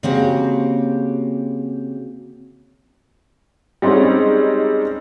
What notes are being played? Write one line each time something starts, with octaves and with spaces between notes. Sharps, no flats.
C#3 A#3 C4 F#4 G4
G3 G#3 C4 C#4 D#4